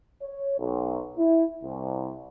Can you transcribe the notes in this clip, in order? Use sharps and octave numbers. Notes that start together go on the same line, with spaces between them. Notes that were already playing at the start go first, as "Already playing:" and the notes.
C#5
B1
E4
C2